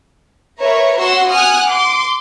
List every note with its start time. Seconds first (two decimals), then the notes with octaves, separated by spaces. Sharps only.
0.59 A#4 B4 C#5 E5 A#5
0.98 F#4 C#5 F#5 C6 C#6 E6
1.31 F#5 G#5 D#6 F6 F#6
1.71 C6 D6